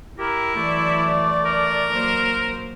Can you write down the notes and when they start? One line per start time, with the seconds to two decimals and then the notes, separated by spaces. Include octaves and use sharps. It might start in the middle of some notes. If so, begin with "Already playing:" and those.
0.18 E4 G4 A#4
0.56 E3 F#3 A3 D5
1.46 A#4
1.91 F#3 A#3 C5